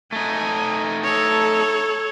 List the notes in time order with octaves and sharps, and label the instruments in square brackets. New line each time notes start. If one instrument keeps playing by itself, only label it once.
[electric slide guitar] A3 D#4 [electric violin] G#5
[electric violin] A4 C#5